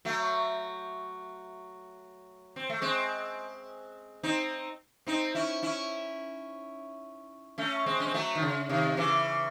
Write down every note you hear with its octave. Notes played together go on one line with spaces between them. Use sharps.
F#3 A3
C4
A3
G#3 C4
C4 D#4
C4 D#4
C#4 E4
C#4 E4
A3 C#4
G#3 C4
C#4
C4
F#3 A3
D#3
C#3
C3 D#3
C#3 E3